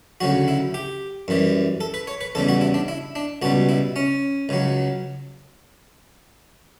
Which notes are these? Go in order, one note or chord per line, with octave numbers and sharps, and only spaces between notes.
D2 C#3 F#3 F#4
E4
G4
F#2 E3 G3
A4
B4
C#5
B4
E2 C#3 G3 A4
F#4
E4
D4
E4
D4
C#2 B2 G3 F#4
E4
C#4
C#2 C#3 F#3